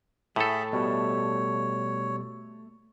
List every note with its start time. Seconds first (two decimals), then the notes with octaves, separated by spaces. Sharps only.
0.36 A2 A3 G#4 A4 E5
0.73 B2 G3 C#5